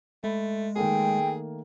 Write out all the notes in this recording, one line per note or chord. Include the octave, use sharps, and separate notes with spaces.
G#3 A3 B5
D#3 A3 A#3 G#4 G5